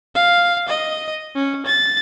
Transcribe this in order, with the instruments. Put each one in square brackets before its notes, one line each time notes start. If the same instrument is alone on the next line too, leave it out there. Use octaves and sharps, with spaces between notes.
[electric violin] F5
D#5
C#4
A6